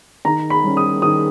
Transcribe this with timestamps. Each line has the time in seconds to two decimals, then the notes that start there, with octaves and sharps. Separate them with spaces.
0.25 D#3 A#5
0.50 B5
0.63 G3 C#4
0.77 D#6
1.02 D#3 D#6